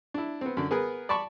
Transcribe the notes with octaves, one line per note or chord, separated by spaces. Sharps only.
D4 E4
B3 C4
F#2 D3
B3 G#4 A#4 B4
D5 A5 B5 C#6